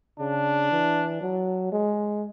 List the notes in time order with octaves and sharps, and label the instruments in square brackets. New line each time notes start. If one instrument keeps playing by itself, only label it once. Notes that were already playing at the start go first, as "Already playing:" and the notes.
[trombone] C#3 [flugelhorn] D4
[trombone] E3
F#3
G#3